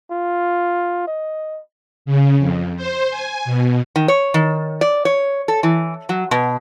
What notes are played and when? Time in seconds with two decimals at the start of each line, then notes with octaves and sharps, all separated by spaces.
0.11 F4
1.08 D#5
2.06 C#3
2.39 F2
2.77 C5
3.11 G#5
3.45 B2
3.96 D#3
4.08 C#5
4.34 D#3
4.81 D5
5.05 C#5
5.48 A4
5.63 E3
6.09 F#3
6.31 B2